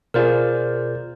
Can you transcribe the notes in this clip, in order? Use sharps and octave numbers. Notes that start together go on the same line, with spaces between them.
B2 F4 G#4 A#4 C5 D5